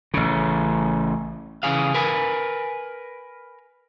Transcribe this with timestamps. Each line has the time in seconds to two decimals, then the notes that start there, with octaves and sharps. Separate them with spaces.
0.14 A1 C#3
1.63 C#3 E3 C#4 G#4 F5
1.94 A#4 B4 G#5